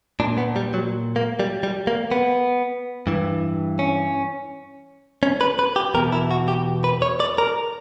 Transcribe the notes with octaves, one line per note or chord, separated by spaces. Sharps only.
A#2 D4
B3
G3
F#3
A#3
G3
G3
A#3
B3
G2 E3
C#4
C#4
B4
B4
G4
E2 B2 A#4
E4
F#4
G4
B4
C#5
D5
A#4